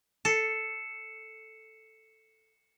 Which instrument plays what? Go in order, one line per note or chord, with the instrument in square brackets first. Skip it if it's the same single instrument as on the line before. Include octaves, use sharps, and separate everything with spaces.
[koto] A4 [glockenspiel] C7 C#7 E7